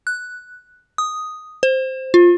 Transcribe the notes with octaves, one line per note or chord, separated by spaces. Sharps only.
F#6
D#6
C5
F4